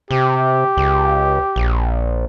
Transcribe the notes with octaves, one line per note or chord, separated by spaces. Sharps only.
C3 G4
C#2
A#1